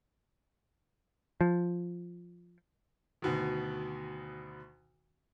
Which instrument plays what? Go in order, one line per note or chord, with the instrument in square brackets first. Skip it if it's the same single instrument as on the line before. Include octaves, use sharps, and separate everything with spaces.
[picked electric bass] F3
[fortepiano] D2 B2 D#3